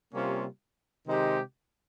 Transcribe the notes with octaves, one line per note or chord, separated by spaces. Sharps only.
C3 G3 A#3 C#4 F4
C3 D#3 G#3 D#4 G4